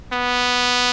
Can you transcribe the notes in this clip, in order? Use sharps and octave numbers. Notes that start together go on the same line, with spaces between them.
B3